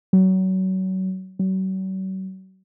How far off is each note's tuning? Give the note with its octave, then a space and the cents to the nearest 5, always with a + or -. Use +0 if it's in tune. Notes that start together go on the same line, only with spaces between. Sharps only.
F#3 +25
F#3 +40